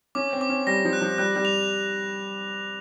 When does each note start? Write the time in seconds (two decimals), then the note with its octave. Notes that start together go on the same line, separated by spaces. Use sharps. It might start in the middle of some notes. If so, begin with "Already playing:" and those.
0.15 C#4 D6
0.33 C4
0.41 D6
0.49 C#4
0.67 G3 A#6
0.85 F3
0.93 F#6
1.01 F3
1.18 G3 F#6
1.36 G3
1.45 F7